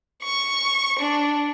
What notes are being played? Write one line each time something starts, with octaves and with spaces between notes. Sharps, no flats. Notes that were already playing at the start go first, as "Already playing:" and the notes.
C#6
D4